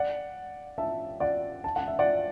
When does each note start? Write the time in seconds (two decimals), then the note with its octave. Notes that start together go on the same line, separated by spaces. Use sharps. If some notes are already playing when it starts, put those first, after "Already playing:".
Already playing: D5 F#5
0.78 E5 A5
1.20 D5 F#5
1.64 A5
1.76 F#5
1.88 E5
1.99 D5 F#5